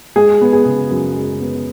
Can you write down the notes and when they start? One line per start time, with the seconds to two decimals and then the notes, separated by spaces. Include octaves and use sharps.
0.16 G#3 G#4
0.41 B3
0.53 G#4
0.66 C#3
0.90 F#2
1.16 G#3
1.40 B3